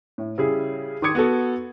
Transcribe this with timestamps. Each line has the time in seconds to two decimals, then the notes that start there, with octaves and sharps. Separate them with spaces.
0.18 A2
0.38 C#3 G3 E4 G#4
1.02 D#3 C6 D6 D#6 G#6 C#7
1.15 B3 F#4 A4